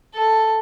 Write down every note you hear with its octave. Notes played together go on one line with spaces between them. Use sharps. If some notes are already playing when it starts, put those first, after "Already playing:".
A4